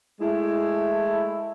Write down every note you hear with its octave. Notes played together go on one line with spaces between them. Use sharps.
G#3 A3 E4